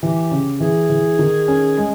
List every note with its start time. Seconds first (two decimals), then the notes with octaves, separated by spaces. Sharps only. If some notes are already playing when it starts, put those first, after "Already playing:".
0.03 E3 G4
0.31 C#3
0.60 E3 G#4
0.90 E3
1.19 D#3
1.48 C#4
1.77 G#3